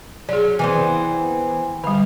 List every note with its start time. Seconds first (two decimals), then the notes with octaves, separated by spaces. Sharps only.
0.29 F#3 G#4 D5
0.59 E3 B3 C4
1.84 D3 G3 F5